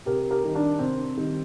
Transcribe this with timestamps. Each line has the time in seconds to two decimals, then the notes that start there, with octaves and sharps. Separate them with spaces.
0.06 C3 G4 A#4
0.30 G4 A#4
0.43 D#3 G3
0.55 D4
0.79 C3 C4
1.17 D#3 G3